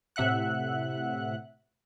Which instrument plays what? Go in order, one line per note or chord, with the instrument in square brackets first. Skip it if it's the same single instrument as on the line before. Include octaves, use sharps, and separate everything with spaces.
[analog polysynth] A2 C3 E5 F#5 F#6